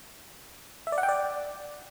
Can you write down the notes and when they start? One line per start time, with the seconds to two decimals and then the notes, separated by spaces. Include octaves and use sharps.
0.87 E5
0.92 D5
0.98 F#5
1.03 G5
1.09 D5